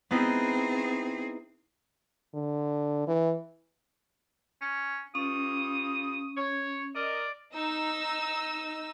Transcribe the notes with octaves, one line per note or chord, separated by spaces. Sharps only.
B3 C4 D#4 E4 G#4
D3
E3
C#4
G2 C#4 F4 D#6
C#5
A#4 D5 D#5
D#4 E6